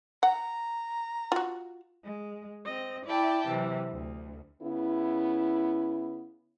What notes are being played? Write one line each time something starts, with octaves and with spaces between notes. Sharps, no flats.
F#5 A#5
F4 F#4
G#3
C4 D#5
E4 D5 E5 G5 A5
C3 E3 F#3
D2
C#3 B3 E4